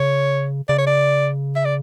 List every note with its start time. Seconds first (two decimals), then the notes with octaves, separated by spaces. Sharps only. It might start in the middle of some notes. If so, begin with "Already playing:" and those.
Already playing: C#3 C#5
0.69 C#3 D5
0.78 C#5
0.87 D5
1.56 E5
1.65 D5